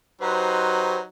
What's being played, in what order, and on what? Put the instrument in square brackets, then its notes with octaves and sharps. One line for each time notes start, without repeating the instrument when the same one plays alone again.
[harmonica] F#3 D#4 [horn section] G4 B4 C5